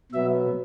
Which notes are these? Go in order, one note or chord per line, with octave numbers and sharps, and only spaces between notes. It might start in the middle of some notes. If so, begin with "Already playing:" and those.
B2 F#3 B3 E5